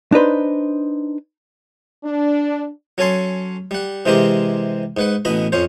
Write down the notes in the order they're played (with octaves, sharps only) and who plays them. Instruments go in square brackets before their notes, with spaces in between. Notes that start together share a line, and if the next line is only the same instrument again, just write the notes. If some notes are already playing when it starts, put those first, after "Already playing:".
[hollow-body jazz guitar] D4 D#4 B4 C5
[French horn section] D4
[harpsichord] F#3 C#4 A4 G#5 C6
G3 F#5
C3 E3 G#3 C4 G4 A#4
G#2 B4 F#5
A1 B2 D#5 B5
F2 C#4 C5